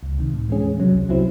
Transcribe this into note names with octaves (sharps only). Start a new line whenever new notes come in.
C#2
C3 D#3
A2
E3 G#3 C#4 G#4
E2
C3 F#3 C#4
C2
C3 F#3 C4 E4